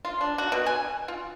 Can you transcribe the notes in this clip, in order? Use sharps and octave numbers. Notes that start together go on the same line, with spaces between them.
F4
D4
F#4
B2
G#5
F4